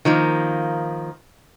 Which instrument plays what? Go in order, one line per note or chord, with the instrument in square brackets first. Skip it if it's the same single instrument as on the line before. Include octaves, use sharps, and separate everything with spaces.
[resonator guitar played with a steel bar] D#3 F3 A#3